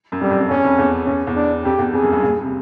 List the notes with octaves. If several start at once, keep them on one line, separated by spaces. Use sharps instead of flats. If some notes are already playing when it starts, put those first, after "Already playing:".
F#2
F2 G3
F#2
F2
E2 C#4
F2
E2
E2 C#4
E2
D4
F2 G4
E2
F2 G#4
F#2
G2
A#2
C3